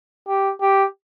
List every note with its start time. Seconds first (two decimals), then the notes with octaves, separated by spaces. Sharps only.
0.28 G4
0.62 G4